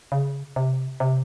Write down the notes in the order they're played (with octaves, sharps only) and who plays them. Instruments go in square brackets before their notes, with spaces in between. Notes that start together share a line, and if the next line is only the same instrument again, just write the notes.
[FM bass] C#3
C3
C3